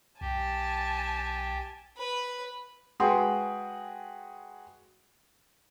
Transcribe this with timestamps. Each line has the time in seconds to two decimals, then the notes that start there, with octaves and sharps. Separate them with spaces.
0.21 B1 G4 G#5 A5
1.97 B4
3.00 G#3 F#4 G#4 B4 G5 C6